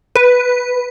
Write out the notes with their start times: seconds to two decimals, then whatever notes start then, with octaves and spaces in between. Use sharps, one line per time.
0.16 B4